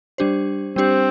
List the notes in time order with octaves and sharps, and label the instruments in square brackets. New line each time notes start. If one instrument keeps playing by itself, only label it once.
[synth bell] G3 D4 G4 C5
[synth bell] G3 D4 G4 C5 [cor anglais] C4